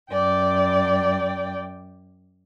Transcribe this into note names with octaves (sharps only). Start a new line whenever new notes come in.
F#2 D5 G5